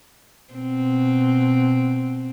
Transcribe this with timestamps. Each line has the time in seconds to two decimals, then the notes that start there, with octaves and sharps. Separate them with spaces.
0.53 B2 C4